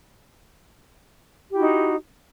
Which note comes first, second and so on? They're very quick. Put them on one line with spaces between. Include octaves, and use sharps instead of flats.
G4 E4 F#4 D#4